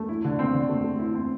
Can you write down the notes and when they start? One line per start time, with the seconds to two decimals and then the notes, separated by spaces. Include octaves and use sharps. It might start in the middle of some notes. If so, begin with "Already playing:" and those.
Already playing: A3
0.09 E4
0.24 D3
0.39 C4
0.54 D3
0.69 A3
0.84 A3
0.99 E4
1.15 C4